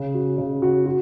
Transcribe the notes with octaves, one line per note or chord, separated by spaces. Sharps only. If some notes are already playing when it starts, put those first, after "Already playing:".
Already playing: C#3
F#4
C#3
F#4
F#4